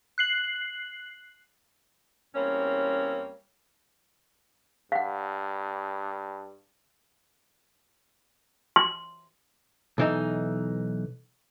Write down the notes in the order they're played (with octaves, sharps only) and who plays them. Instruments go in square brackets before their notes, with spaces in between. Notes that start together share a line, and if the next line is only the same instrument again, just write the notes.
[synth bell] F#6 C7 F#7
[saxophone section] E2 G3 A#3 C4 C#4 C#5
[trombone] G2 [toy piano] F5 F#5
[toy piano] C6
[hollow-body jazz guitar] B1 E3 D#4